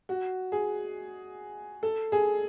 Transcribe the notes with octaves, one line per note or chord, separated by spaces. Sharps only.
F#4
G#4
A4
G#4